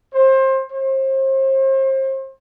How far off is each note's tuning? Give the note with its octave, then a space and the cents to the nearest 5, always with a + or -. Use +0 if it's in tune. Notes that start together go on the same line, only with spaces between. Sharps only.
C5 +25
C5 +35